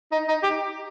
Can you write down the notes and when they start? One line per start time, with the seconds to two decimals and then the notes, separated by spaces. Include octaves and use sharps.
0.12 D#4
0.28 D#4
0.43 G4